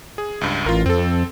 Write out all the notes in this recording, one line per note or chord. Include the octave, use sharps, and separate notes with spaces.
G#4
C#2 G2
A1 F4 A#4
F2 C4 A4